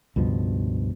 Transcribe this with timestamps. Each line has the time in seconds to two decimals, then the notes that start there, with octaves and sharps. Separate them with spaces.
0.16 C#2 G2 B2 F3